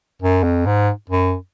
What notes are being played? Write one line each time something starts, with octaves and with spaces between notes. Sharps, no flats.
F#2
F2
G#2
F#2